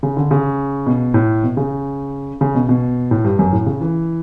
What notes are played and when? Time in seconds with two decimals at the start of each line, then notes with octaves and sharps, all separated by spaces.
0.03 C#3
0.17 D3
0.31 C#3
0.86 B2
1.14 A2
1.43 B2
1.57 C#3
2.41 C#3
2.55 B2
2.69 B2
3.11 A2
3.24 G2
3.39 F#2
3.53 A2
3.66 C#3
3.81 E3